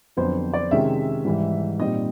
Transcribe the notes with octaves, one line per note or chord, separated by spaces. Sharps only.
F2 D3 F#3 B3 C5
D5
C3 D#3 G#3 C#4 E5
G#2 E3 G3
A#2 G3 C4 D#4 D#5